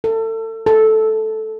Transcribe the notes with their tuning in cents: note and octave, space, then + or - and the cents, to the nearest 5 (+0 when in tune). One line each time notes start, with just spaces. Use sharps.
A4 +30
A4 -5